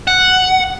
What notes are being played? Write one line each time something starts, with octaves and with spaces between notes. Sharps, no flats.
F#5